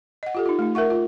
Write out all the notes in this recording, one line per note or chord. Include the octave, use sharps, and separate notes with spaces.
D#5 F#5
F4 G4 A4
D#4 F4
A3 D#4
A#4 E5 F#5 C#6
F4